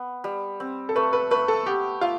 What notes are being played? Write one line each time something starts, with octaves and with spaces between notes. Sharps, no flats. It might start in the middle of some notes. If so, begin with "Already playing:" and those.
Already playing: B3
G3
C4
A4
A3 B4
B4
A3 B4
A4
B3 G4
F4 E5